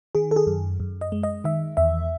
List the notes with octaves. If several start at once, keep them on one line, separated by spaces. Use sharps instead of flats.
D#3 G#4
A4
G#4
F#2
F#2
D#5
G#3
D#5
D#3 E5
E2 E5